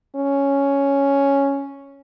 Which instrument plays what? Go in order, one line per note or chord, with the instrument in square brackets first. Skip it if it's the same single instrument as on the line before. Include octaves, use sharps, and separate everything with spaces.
[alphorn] C#4